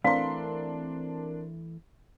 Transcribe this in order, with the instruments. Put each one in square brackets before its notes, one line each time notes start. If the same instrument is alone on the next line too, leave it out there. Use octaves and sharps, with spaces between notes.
[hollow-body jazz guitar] E3 A3 [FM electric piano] C4 A#4 [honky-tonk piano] D4 C6 [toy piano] F5